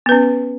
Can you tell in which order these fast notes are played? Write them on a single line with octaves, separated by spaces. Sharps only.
B3 B4 C#4